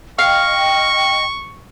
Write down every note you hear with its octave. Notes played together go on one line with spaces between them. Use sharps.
D#5 F5 G5 C#6